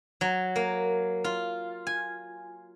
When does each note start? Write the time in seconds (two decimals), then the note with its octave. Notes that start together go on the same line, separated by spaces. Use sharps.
0.21 F#3
0.56 A#3
1.24 F4
1.87 G#5